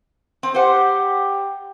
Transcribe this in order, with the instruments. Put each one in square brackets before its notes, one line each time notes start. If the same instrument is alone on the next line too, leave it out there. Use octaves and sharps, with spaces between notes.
[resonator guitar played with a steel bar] C4
[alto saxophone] G4 [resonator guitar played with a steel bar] C5 F#5